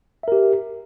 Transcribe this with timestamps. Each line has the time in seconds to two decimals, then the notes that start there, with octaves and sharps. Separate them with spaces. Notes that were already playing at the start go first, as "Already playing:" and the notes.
0.23 E5
0.28 A#4
0.32 G4